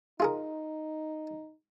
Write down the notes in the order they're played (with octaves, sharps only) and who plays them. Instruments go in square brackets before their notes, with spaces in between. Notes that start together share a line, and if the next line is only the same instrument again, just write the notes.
[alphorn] D#4 [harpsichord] F4 G#4 A#4